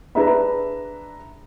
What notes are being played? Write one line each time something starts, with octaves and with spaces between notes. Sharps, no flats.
D4 G#4 B4 E5 A#5 B5